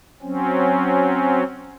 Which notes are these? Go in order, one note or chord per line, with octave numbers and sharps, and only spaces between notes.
F#3 C4 C#4